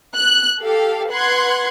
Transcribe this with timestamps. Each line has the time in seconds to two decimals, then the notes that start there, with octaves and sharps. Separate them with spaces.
0.15 F#6
0.61 G4 A4 F5
1.11 B4 F#5 C6 F#6 G#6